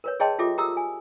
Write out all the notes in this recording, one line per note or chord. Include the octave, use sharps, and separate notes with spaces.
A#4 B4 C#5
G#4 C#5 D#5 G5 A5 C6
F4 G4 A4 E5 D6
G4 A#4 A#5 D#6 E6
G#5